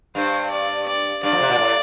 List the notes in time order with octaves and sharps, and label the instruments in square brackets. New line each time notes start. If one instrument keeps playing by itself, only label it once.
[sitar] G2 [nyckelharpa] C5
[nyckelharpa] D5
D5
[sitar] G2 [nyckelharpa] D5
[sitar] F2
C3
A#2
A2